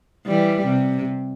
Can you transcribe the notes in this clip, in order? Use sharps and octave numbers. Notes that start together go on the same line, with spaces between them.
E3 G3
C3